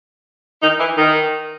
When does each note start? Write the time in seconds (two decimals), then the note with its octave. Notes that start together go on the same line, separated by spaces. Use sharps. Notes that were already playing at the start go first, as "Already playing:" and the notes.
0.62 D#3 D#4
0.79 E3 E4
0.97 D#3 D#4